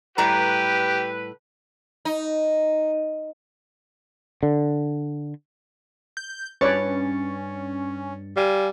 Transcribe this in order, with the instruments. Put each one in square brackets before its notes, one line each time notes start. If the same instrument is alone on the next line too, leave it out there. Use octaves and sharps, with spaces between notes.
[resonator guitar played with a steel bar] A2 G3 A#5 [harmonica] G4 [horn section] B4
[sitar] D#4
[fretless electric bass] D3
[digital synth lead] G6
[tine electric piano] G2 A6 C#7 [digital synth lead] C#4 [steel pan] B4 C#5 D5
[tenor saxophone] G3 [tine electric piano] F5 G#5